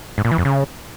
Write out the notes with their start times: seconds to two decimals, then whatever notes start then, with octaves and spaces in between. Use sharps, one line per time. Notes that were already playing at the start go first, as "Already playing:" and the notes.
0.18 G#2
0.25 A#2
0.31 E3
0.38 F2
0.45 C#3